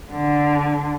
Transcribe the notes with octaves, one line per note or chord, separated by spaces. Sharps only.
D3